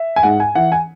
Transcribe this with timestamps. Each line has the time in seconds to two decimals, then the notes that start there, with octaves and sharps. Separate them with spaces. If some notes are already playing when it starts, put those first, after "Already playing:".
Already playing: E5
0.16 G#5
0.23 G#2 F#5
0.40 G#5
0.55 E3 F#5
0.72 G#5